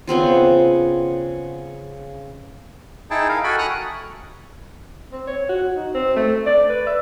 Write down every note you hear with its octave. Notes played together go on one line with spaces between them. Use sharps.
C#3 B3 C4 F4
D#4 E4 G#4 G5 A5
A#4 F5
F#4 A4 G5 G#5 B5
C#6 D#6 F6 F#6
C4
C#5
F#4
D#4
C4
A3
D5
B4
E5